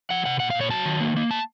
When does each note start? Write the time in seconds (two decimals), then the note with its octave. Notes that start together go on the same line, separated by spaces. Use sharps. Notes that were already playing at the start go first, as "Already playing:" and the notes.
0.10 F3 F#5
0.26 C3 F#5
0.40 A#2 F#5
0.50 F5
0.55 A#2
0.61 C#5
0.70 F#3 A5
0.85 D#3
1.01 A#3
1.16 A#3
1.31 A5